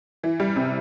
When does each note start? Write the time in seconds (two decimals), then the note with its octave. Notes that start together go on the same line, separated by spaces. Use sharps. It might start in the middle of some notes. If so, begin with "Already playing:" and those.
0.24 E3
0.40 G3
0.56 C3